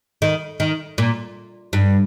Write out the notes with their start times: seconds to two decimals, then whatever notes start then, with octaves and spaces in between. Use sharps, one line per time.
0.22 D#3
0.60 D#3
0.98 A#2
1.73 G2